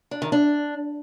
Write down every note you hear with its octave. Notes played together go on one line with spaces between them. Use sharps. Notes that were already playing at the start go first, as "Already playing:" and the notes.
D4
D#3
D4